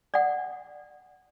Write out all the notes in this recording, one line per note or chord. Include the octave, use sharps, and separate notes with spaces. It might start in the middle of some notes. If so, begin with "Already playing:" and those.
D5 F#5